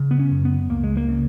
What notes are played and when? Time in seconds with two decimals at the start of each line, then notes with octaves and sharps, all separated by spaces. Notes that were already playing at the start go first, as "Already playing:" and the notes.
Already playing: C#3
0.11 B3
0.19 C#4
0.31 F#2
0.45 B3
0.70 C#2 A#3
0.84 G#3
0.97 A#3
1.09 C#3